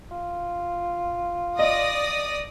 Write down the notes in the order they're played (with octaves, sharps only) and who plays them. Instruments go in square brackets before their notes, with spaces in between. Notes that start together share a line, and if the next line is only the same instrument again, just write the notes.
[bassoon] F4
[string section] D5 D#6 A#6 [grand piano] D#5